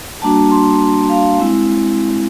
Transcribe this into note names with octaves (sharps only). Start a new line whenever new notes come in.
G3 A#3 D4 F#4 A5
C6
F5
G#3 C4 E4